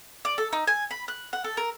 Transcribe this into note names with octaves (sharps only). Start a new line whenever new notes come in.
D5
A4
D#4
G#5
B5
F#6
F#5
A4
A#4